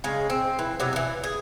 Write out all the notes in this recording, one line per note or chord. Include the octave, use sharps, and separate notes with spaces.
C#3 G#3
C4
E3
C3 F#3 B3
D3 E3
G#4